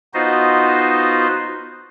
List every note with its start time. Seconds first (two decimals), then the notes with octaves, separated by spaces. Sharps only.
0.14 B3 D#4 F4 F#4 C5 D#5